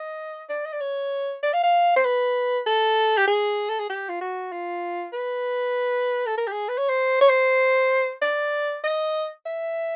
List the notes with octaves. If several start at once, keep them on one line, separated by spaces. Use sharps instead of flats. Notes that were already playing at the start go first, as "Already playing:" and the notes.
Already playing: D#5
D5
D#5
D5
C#5
D5
F5
F5
C5
B4
A4
G4
G#4
A4
G#4
G4
F4
F#4
F4
B4
A4
A#4
G4
G#4
B4
C#5
C5
C#5
C5
D5
D#5
E5